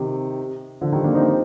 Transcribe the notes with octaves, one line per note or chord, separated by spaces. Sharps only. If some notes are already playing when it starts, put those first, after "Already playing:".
Already playing: C3 D#3
D3 F3
D#3 G3
A#3 D4
C4 D#4